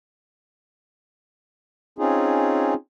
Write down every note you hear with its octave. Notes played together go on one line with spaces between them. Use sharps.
C4 C#4 D#4 F4 G#4